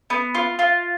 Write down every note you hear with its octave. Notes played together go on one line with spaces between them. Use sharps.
B3
F4
F4